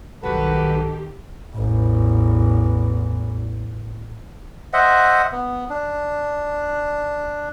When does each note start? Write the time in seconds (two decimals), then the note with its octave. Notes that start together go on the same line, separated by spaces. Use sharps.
0.23 B1 G2 D#3 F#4 G4 A4 B4
1.55 A1 E2
4.73 C5 D#5 E5 F#5
5.32 B3
5.70 D4